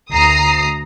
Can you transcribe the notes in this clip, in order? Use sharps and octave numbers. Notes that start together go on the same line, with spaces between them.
D2 A#5 D#6 C7